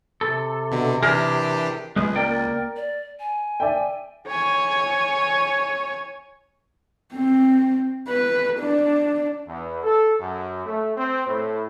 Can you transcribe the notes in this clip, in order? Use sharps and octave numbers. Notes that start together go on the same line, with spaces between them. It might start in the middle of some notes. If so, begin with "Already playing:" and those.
C3 A4
B2 D3
E3 D4 G4 G#4 A#4
C#2 G#3 G#4 B4
A#3 A#4 D5 G5
D5
G#5
D5 E5 G5
C#5 G#5
C4
B4
D4
E2
A4
F#2
A3
C4
A2